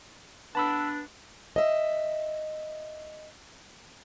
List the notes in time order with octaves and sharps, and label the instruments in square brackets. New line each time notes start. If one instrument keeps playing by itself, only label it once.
[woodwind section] B3 D4 B4 [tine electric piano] A5 B5 E6
[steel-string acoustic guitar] D#5 E5